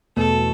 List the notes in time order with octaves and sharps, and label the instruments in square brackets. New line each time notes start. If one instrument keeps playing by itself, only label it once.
[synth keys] E2 B2 A3 [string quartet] A4